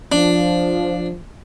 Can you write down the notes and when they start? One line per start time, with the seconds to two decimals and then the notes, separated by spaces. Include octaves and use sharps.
0.12 F3 D4